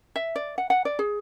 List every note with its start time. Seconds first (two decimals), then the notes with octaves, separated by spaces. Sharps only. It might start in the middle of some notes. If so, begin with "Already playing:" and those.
0.16 E5
0.36 D5
0.58 F#5
0.70 F#5
0.85 D5
0.99 G#4